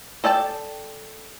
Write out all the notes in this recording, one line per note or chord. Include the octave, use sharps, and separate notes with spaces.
A4 D5 G5 A5